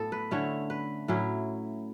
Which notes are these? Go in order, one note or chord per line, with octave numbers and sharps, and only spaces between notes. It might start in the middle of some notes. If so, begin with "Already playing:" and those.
Already playing: A2 B3 A4
B4
D3 A3 C#4 E4 C#5
B4
A2 F#3 C#4 E4